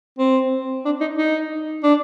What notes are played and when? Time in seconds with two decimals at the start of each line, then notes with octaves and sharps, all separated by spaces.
0.19 C4
0.85 D4
1.01 D#4
1.18 D#4
1.83 D4